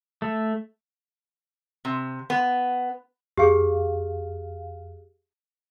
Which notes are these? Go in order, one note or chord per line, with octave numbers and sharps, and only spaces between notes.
A3
C3
B3
F2 G4 G#4 F5